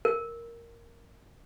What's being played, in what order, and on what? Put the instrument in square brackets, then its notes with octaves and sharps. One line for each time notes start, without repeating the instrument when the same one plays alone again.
[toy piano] A#4